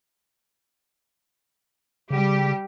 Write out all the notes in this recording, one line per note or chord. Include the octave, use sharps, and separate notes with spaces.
C#3 G3 G4